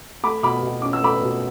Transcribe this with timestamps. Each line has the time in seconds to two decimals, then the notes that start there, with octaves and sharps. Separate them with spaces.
0.23 A3 B5 D6
0.43 B2 B5 D6
0.62 B2
0.82 C#4 D6
0.93 E6
1.02 A3 B5 D6
1.22 B2